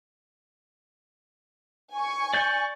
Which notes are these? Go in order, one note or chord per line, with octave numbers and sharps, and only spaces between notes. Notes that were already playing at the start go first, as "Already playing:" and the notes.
G#5 C#6
D5 G6